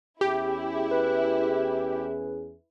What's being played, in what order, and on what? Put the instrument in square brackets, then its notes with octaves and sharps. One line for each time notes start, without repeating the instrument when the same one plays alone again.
[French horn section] E2 C#4 G#4 [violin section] E4 [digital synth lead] G4
[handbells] B4